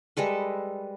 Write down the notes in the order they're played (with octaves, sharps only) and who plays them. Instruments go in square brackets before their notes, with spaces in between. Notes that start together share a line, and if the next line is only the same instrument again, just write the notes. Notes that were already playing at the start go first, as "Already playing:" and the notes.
[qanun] G3 G#3 A4 B4